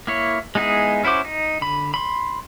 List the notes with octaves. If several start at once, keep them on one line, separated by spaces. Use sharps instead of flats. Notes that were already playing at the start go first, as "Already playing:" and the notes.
A#3 E4 C#5
G#3 B3 D#4 E4 G#4
C#4 E4 F#4 C5 D6
D#4
D3 B5
B5 C6